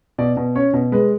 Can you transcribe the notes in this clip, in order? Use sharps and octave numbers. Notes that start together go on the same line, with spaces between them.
B2 D5
B2
C#4 C#5
B2
G#3 B4